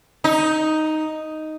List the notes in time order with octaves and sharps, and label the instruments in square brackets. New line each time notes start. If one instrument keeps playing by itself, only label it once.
[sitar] D#4